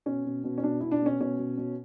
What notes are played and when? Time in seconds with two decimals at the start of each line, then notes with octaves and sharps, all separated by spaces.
0.06 B2 C#4
0.25 B2
0.44 B2
0.58 C#4
0.63 B2 D4
0.80 B2 E4
0.91 D4
1.02 B2 C#4
1.20 B2 C#4
1.38 B2
1.58 B2